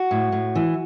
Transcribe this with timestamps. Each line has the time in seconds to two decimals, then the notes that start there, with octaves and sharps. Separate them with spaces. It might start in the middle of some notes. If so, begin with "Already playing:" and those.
Already playing: F#4
0.11 A2
0.32 A2
0.55 E3